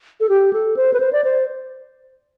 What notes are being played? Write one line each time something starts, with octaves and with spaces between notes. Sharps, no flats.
A4
G4
A4
C5
B4
C5
D5
C5